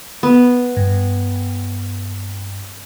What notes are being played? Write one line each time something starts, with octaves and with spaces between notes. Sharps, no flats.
B3
G2